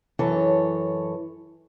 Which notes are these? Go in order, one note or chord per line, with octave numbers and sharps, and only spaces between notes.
F#2 E3 A4 C#5